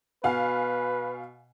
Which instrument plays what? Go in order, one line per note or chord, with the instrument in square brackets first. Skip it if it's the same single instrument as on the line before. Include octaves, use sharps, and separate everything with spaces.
[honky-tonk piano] B2 F5 G#5 [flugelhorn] B4